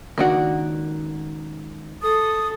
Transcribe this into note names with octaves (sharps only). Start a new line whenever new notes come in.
C#2 D#3 A#3 D4 F#4 F#5
A4 D#6